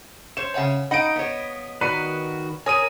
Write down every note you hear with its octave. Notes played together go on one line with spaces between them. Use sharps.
C5 C#5 E7
C#3 C#5 E5 F#5 G#5
D#4 D#5 F5 F#5 B5 D7
B3 C#5
D#3 F#4 B4 D5 A#5 D#7
A#4 C#5 G#5 D#6 D#7